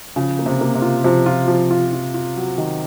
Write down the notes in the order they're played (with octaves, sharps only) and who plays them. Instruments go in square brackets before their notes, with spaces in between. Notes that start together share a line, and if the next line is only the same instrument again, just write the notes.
[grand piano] C#3 [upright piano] F3
[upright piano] A#3
[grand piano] C3
[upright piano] A#3
[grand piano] C3
[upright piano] F4
[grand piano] C3 [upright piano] F3
[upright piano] F4
F3
F4
F4
F4
F#3
D#3